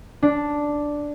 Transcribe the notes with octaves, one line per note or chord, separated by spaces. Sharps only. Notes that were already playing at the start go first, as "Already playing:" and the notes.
D4